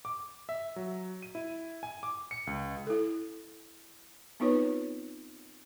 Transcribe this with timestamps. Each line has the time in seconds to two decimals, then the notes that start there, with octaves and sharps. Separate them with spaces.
0.05 D6
0.49 E5
0.76 F#3
1.22 D#7
1.35 E4
1.83 G#5
2.03 D6
2.31 C#7
2.47 C#2
2.87 E4 A4
4.40 B3 C4 D#4 F4 B4 C#5